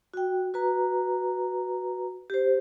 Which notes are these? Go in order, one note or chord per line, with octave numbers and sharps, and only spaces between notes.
F#4 G5
F#4 B4 A#5
G4 C5